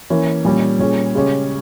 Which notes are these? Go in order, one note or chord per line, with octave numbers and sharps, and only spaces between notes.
E3 A#3 C#4
A#2 G3 C#4
A#2 G3 C#4 G#4
C#3 G#3 C#4 G4